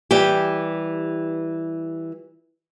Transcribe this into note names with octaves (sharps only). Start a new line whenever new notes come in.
E3 G3 G4